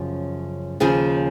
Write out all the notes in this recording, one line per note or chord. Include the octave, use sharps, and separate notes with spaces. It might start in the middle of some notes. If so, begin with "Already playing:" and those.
Already playing: F#2 C#3 F3
D#2 C#3 F3 G#4